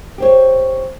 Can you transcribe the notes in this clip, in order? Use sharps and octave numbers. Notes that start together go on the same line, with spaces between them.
G4 C5 C#5